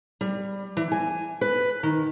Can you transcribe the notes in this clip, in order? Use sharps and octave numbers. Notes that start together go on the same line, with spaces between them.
G3
E3
G#5
B4
D#3